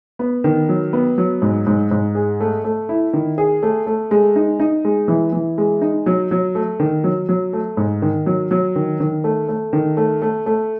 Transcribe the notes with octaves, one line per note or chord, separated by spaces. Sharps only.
B3
D#3
F#3
B3
F#3
G#2
G#2
G#2
G#4
A3
A3
E4
D#3
G#4
A3
A3
G#3
D#4
D#4
G#3
E3
E3
G#3
D#4
F#3
F#3
A3
D#3
F#3
F#3
A3
G#2
D#3
F#3
F#3
D#3
D#3
A3
A3
D#3
A3
A3
A3